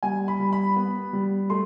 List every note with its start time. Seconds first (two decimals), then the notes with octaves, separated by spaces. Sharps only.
0.03 G3 G#5
0.28 B5
0.39 G3
0.53 B5
0.76 B3
1.13 G3
1.50 A3 C6